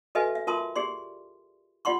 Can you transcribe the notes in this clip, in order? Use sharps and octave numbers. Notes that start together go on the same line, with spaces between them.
F#4 A4 B4 D#5 E5 G#5
E5
F4 A#4 E5 A5 C6 D#6
G4 G#4 D5 C6
F4 G4 D5 F#5 C6 C#6